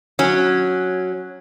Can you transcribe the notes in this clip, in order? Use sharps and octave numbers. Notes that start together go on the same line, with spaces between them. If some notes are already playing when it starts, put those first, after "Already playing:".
F#3 C#4